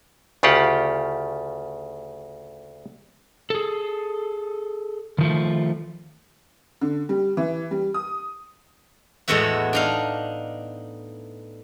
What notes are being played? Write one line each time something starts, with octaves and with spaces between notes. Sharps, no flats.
D2 C#3 F4 G4 F#5
G#4 A4
D#3 F3 A3
D3
G3
E3
G3
D#6
E2 A2 G#3 B3 F#4 E5
D4 D#4 F5